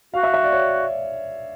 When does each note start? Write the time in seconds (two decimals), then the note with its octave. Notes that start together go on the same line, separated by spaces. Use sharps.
0.14 F#4 F5
0.23 E5
0.34 E5
0.44 D5
0.53 C#5